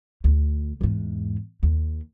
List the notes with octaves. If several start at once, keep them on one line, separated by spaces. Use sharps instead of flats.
D2
E2 G#2
D#2